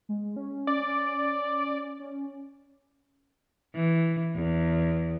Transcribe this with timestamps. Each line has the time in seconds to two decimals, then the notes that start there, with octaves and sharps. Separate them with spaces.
0.09 G#3
0.36 C#4
0.67 C#4 D5
2.00 C#4
3.75 E3
4.35 E2